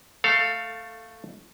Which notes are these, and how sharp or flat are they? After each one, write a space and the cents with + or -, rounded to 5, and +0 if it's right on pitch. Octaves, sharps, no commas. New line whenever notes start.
A3 +5 A4 +20 F5 +0